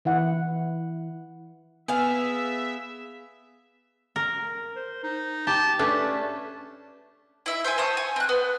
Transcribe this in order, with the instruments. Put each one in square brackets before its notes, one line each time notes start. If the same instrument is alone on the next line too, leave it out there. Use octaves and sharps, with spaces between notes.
[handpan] E3 E4 F#5
[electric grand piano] B3 [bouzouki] G#4 F5 [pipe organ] E5 [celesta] G#5
[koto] A#4
[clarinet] C5
D#4
[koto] G4 [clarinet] A5
[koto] A3 C#4 D4 [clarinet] B4
[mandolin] E4 E5
C5 E5 G5 G#5
C5 A5 C#6 D#6
G#5
C4 F#6
B3